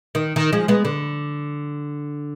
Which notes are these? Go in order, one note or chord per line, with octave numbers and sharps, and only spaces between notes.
D#3
D#3
F3 G#3
G#3 B3
D3